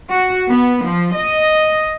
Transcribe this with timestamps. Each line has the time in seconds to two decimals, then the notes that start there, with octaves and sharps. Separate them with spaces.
0.11 F#4
0.49 B3
0.86 F3
1.15 D#5